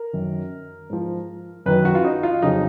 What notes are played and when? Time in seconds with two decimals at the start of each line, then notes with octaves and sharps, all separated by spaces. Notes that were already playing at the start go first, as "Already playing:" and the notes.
Already playing: A#4
0.13 F#2 D#3 F#3
0.90 G#2 F3
1.66 F#2 D#3 F#3 B4
1.85 F#4
1.95 F4
2.04 D#4
2.23 F4
2.42 F2 C#3 F#3 D#4